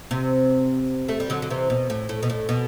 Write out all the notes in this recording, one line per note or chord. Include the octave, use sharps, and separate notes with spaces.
C3
A3
G3
D3 F#3
D3
C3 E3
B2
A2
A2
B2
A2
B2